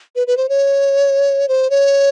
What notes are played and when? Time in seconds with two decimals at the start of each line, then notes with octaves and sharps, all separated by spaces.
0.16 B4
0.27 B4
0.37 C5
0.49 C#5
1.48 C5
1.70 C#5